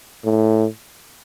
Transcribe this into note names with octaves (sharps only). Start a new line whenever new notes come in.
A2